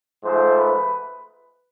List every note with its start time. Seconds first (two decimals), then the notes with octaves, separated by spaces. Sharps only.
0.23 G#2 F3 A3 C5
0.56 B4